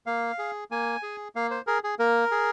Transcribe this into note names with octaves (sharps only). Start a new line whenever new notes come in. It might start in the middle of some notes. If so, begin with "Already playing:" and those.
A#3 F5
G#4
A#3 G#5
G#4
A#3 F5
C5
G#4 A#4
G#4
A#3 A#4
G#4